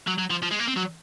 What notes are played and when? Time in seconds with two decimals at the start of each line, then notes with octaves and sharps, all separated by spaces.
0.08 F#3
0.19 F#3
0.31 F3
0.43 F3
0.51 G#3
0.60 A#3
0.68 C4
0.77 F#3